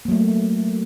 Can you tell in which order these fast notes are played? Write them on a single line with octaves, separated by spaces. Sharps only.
A#3 F#3 A3